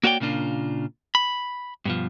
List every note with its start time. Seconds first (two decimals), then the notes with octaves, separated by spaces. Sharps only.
0.03 A#3 F#4 C#5 D5 G5
0.20 A#2 C#3 A#3 D4 F4
1.15 B5
1.85 G2 B2 F3